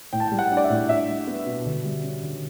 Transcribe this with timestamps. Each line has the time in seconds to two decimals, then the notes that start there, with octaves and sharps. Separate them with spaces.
0.13 A2 G5
0.20 A5
0.28 G5
0.31 G3
0.39 F#5
0.51 D4
0.57 D5
0.64 E5
0.70 A2
0.89 D4 E5
1.09 G3
1.27 B3
1.46 B2
1.66 D3
1.85 G3
2.03 C#4
2.23 D3